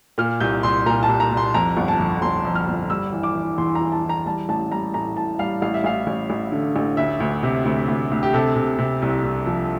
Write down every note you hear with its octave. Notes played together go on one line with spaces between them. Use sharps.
A#2 F6
C2 G6
C2 C6
A#2 A#5
A5
C2
A#5
C2
C6
F2 A#5
G1
A5
F2
G1 C6
F2
F6
G1
G3 E6
E3
D6
E3
E2 C6
A#5
E3
A5
E3
A#5
G3 A5
A1 A5
G3 A#5
A2 A#5
A2 A5
G3 F5
A1 F5
E5
A1 F5
A1
A1
D3
A1
D2 E5
D2
C3
D2
D2
D2
G4
C3 A4
C3
C3
C2
C2
F3